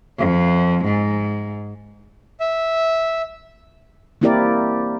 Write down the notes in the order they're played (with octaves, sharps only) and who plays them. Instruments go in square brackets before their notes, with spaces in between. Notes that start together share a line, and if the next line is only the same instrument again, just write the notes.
[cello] F2
G#2
[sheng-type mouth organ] E5
[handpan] A#3 C4 E4 G4 A#4 D5